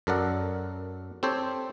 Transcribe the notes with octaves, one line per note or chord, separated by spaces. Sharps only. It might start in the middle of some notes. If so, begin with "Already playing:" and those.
F#2 A4 A#4 D5 F#5
C4 G4 A4 C5 C#5